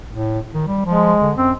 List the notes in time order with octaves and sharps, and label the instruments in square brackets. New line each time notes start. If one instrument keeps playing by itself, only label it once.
[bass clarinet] A2
D#3
G3
[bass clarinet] F3 [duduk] G#3
[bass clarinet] D3
[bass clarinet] F#2 [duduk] C4